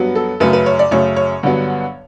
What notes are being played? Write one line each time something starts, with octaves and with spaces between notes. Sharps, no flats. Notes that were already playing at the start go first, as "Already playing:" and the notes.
Already playing: G2 F#3 B3
A4
F#2 C#3 F#3 A3 B4
B4
C#5
D5
F#2 C#3 F#3 A3 C#5
C#5
G2 D3 F#3 B3